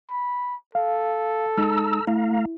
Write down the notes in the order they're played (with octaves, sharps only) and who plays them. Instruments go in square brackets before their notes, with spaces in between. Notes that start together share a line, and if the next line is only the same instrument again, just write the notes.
[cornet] B5
[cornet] A4 [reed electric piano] F5
[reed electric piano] G#3 D#4 [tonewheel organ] A#5 E6
[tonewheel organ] A3 F5 A#5 [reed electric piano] E4